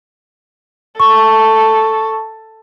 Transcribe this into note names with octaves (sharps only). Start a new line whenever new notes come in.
A4 C#6